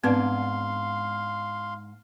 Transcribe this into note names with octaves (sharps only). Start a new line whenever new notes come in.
G#2 B3 C4 D4 B4 F5 C6